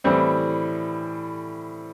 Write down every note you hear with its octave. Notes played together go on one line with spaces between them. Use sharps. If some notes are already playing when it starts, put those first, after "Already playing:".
A2 E3 G3 C4